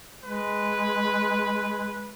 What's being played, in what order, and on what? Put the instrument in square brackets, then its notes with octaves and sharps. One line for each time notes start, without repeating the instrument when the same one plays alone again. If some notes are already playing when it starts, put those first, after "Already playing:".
[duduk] G#3 [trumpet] B4